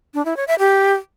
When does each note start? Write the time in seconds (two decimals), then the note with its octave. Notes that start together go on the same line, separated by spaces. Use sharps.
0.14 D4
0.25 E4
0.36 C#5
0.48 E5
0.59 G4